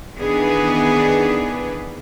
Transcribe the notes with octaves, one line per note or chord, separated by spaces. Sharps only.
D#3 E3 B3 D4 G#4 B4